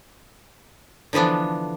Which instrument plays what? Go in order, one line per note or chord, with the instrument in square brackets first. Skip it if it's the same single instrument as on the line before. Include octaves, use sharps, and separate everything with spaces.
[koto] D3 E3 F3 B3 D4